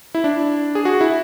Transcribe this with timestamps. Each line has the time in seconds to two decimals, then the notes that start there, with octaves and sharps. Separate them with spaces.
0.15 E4
0.24 D4
0.75 G#4
0.85 F#4
1.01 E4